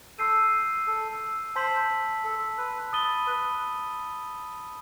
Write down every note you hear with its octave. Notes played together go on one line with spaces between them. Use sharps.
A4 C6 E6 G6 C7 D#7
A4
C5 A5 C6 E6 B6 F#7
A4
B4
B5 D#6 A6 D#7 G7
B4